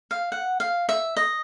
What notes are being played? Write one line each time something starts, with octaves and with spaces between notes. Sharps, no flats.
F5
F#5
F5
E5
D#5